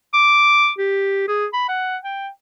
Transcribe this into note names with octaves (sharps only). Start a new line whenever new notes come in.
D6
G4
G#4
B5
F#5
G5